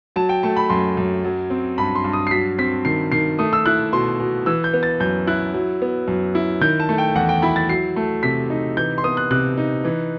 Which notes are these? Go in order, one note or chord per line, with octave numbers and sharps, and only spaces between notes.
F#3 A5
G5
A3 A5
B5
F#2 C6
F#2
F#3
C4
G2 B5
C6
G2
D#6
C7
F#3 B6
C4 B6
D#3 C7
D#3 C7
A3 D#6
E6
E4 F#6
B2 C6
B2
E3 E6
G6
B3
A6
F#2 G6
E4 F#6
F#3
B3
F#2
E4
D#3 G6
A5
A3
G5
E2 F#5
G5
E4 B5
A6
F#3 C7
A3
C3 B6
D#4
E3 G6
C6
B3 D#6
F#6
C3 F#6
D#4
E3